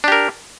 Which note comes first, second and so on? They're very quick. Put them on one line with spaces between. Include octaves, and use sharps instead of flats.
D4 G4 A#4